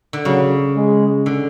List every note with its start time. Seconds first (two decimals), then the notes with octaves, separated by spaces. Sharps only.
0.13 D3
0.25 C#3 F#3
0.76 G#3
1.26 D3